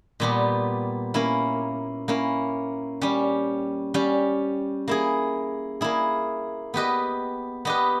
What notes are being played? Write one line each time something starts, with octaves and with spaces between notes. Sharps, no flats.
A#2 G3 B3 G4
A#3 C#4 E4
A#3 C#4 E4
G3 C#4 G4
G3 C#4 G4
A#3 E4 G#4
A#3 E4 G#4
B3 G4 B4 D#5
B3 G4 B4 D#5